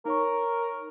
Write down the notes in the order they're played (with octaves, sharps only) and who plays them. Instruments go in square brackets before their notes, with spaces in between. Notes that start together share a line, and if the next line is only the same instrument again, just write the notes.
[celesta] D#4 C#5 C#6 [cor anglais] A#4